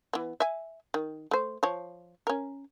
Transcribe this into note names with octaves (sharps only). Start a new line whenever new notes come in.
E3 B3
E5 G#5
D#3
A3 C5
F3 C#5
C#4 A#4